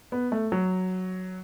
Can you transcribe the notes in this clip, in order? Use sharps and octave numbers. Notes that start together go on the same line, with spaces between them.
B3
A3
F#3